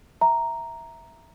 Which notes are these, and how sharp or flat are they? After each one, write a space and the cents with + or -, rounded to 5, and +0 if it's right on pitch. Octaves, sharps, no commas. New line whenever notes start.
E5 +0 A#5 +0